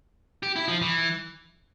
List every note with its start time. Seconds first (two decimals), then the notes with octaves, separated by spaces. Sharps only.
0.43 G4
0.56 E4
0.68 F3
0.81 E3